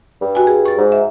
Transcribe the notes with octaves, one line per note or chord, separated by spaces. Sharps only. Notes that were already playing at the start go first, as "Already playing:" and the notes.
G2
F#4 G#5
G#4
C#6 A6
G#2
E5